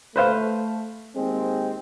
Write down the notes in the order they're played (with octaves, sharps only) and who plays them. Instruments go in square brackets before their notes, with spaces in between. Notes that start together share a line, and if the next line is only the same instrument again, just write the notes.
[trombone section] A3 [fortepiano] B4 C5 F5
[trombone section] D#2 G#3 C4